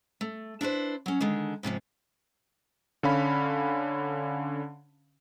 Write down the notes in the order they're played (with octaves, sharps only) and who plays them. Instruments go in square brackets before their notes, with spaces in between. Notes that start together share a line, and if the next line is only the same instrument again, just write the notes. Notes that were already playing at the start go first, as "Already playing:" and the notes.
[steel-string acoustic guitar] A3
D4 E4 B4 C5
F#3 C#4
D3 D#3 G#3
G#2 C3 D#3 F3
[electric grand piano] D3 C#4 F5 B5